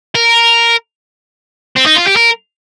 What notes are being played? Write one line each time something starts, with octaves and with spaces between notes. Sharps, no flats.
A#4
C4
D#4
F4
G4
A#4